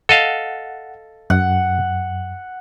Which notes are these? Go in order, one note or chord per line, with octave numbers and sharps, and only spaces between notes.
A4 D#5 F5 F#5
F#2 F#5